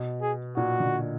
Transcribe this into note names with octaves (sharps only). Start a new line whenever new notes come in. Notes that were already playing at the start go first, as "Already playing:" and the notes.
Already playing: B2
G#4
A#2 F#4
D3